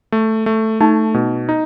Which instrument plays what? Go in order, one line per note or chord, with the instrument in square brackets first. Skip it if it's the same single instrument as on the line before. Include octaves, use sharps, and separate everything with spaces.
[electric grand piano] A3
A3
[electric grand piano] A3 [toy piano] D#4
[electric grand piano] B2
D#4